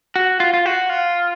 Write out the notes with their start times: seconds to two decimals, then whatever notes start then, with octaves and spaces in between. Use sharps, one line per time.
0.16 F#4
0.40 F4
0.54 F4
0.66 F#4
0.89 F4